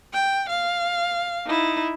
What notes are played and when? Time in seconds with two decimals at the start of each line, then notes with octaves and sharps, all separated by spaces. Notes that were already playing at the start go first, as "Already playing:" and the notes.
0.13 G5
0.49 F5
1.46 D#4 E4